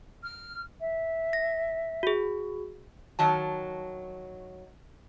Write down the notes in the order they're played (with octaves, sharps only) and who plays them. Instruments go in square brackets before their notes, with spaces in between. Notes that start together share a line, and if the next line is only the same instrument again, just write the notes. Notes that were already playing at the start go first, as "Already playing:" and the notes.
[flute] F6
E5
[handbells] A#6
F#4 G#4
[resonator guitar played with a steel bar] D#3 F#3 A5